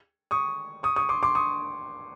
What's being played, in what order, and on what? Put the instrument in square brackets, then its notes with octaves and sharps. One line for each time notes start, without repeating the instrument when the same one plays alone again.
[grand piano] C#6 D#6
C#6 D#6
C#6 D#6
C6 D6
C6 D6
C#6 D#6